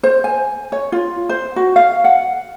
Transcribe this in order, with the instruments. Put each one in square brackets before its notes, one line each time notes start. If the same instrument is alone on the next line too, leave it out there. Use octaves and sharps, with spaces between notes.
[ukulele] C5
G#5
C#5
F4
C5
F#4
F5
F#5